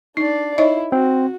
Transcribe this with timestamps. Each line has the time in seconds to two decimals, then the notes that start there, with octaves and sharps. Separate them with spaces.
0.17 D4 D#4 D5 C7
0.58 D#4 E4 C#5 D#5
0.92 C4 F#4